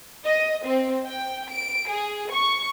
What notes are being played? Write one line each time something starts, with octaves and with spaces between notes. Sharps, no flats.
D#5
C4
G5
D7
G#4
C#6